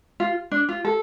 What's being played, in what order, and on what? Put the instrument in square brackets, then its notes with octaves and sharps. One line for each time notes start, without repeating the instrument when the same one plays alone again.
[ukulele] F4
D4
F4
A4